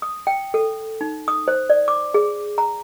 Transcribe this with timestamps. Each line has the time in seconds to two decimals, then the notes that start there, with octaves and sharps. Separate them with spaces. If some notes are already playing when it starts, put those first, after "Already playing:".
0.02 D#6
0.27 G5
0.54 A4
1.01 D#4
1.28 D#6
1.48 C5
1.70 D5
1.88 D6
2.14 G#4
2.58 A#5